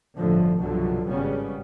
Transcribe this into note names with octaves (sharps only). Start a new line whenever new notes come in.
G1 A2 D3 F3
C2 G2 B2 D3 F3 F#3
G#1 C#3 G3 B3 C#4